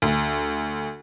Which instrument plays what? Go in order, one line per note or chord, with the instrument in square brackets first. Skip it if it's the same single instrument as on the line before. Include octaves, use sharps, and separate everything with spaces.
[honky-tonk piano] D2